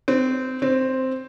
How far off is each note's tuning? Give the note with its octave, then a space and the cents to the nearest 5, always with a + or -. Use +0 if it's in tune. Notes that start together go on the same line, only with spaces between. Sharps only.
C4 -20
C4 +0